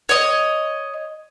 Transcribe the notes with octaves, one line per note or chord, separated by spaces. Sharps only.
C#5 D#5